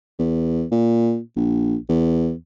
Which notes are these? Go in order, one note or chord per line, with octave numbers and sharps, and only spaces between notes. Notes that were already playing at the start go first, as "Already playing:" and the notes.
E2
A#2
A#1
E2